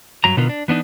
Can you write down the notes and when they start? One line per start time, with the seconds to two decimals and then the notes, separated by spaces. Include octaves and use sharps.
0.24 G2 F#3 A#5
0.37 B2 D3 D#3 B3 F4 A#4
0.49 D4
0.68 E3 B3 D4 D#4